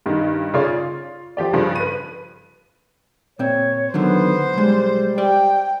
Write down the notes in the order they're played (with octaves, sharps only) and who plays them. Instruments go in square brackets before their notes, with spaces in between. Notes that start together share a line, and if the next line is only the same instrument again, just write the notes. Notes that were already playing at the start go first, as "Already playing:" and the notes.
[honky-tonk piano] G2 D#3
C#3 F4 C#5 D5
F4
F3 G4 D5
G2 C#3 F3
B4 D#7
[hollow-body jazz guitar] A#2 C4 [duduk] C#5
[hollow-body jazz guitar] D3 D#3 F#3 [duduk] B3 [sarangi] C5
[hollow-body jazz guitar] B1 G#3 [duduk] G3
[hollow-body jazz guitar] G4 D5 [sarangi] G5